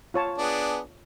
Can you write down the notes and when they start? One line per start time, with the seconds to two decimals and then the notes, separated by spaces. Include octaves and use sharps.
0.14 F4 C#5 A5
0.38 B3 D4 G#4